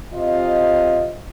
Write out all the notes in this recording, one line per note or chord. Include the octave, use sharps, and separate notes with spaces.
C3 F4 D#5